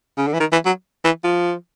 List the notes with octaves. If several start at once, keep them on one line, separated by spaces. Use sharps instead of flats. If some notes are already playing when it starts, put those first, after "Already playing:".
C#3
D3
E3
D#3
E3
F#3
E3
F3